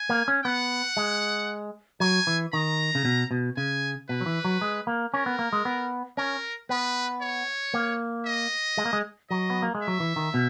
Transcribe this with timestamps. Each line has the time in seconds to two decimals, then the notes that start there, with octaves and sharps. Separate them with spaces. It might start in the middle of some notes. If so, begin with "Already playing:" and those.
Already playing: G#5
0.09 A#3
0.28 C#4
0.45 B3 F#5
0.97 G#3
2.00 F#3 G#5
2.27 E3
2.53 D#3 A#5
2.95 C#3
3.05 B2
3.31 B2
3.57 C#3 G#5
4.09 B2 B4
4.21 F#3
4.26 E3
4.45 F#3
4.61 G#3
4.87 A#3
5.14 C#4 A#4
5.26 B3
5.39 A#3
5.53 G#3
5.65 B3
6.17 C#4 A#4
6.69 B3 B4
7.21 C#5
7.74 A#3
8.26 D#5
8.77 G#3
8.85 A#3
8.93 G#3
9.30 F#3 D#5
9.50 B3
9.62 A#3
9.75 G#3
9.82 E5
9.88 F#3
10.00 E3
10.16 D#3
10.34 B2